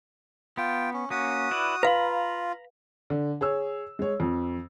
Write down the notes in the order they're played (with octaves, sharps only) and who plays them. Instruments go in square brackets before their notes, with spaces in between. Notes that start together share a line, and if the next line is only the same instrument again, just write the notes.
[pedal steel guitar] B3 [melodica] F4 G5
[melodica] C#4
[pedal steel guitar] A#3 C#4 [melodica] F#4 D#6
[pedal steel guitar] E4 B4 D5
[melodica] F4 [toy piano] B4 F5 [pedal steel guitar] A#5 B5
[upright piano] D3
G#4 C#5 E6
G#3 C#5
F2